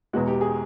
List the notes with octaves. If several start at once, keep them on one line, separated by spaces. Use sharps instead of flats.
E1 E2 B2 G#3 F#4
G4
G#4